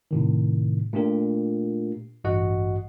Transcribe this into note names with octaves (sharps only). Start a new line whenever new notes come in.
A2 C3 D#3
A#2 A3 D4 F4 G4 A#4
A1 G2 F#4 D#5 F#5